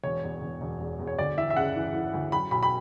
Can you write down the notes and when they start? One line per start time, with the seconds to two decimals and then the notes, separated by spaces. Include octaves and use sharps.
0.04 E1 C#5
0.23 E2
0.41 E1
0.61 E1
0.80 E2
0.99 E2
1.07 C#5
1.19 D2 D5
1.37 E3 E5
1.50 E5
1.56 C#3 F#5
1.76 E3
1.94 E3
2.14 D2
2.32 F#3 B5
2.51 B1 B5
2.63 B5